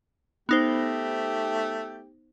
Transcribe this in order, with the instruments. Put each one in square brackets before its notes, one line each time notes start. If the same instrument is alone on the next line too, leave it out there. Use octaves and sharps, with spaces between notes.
[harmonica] A3 G4 [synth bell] B3 D#4 C5